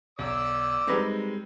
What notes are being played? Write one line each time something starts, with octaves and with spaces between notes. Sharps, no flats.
B1 D5 D6 E6
G3 G#3 C4 D#4 A#4 B4